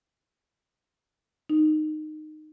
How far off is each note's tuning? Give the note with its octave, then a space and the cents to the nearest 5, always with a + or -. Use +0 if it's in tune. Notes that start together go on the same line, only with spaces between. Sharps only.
D#4 -15